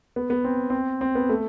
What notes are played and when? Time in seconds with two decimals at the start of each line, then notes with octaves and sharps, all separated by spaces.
0.16 B3
0.30 B3
0.44 C4
0.70 C4
1.01 C4
1.15 B3
1.29 A3